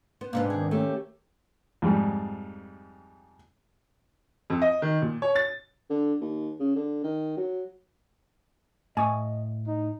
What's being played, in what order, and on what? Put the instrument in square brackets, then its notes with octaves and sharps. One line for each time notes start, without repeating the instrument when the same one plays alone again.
[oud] B3 [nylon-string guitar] C5
[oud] G#2 C3 B3 [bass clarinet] A#3 [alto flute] D4
[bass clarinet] D#3 [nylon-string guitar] G#4
[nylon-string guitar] A3 A#3 C#4 [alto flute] G4
[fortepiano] F2 G#2 G3
[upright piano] F2
D#5
D#3
A#2
C#5
A6
[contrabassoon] D3
D#2
C#3
D3
D#3
F#3
[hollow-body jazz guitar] A2 [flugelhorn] D#5 [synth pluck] G#5 C#6 D#6
[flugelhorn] D#4